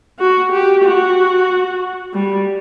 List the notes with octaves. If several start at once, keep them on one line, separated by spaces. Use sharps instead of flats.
F#4
G4
F#4
G3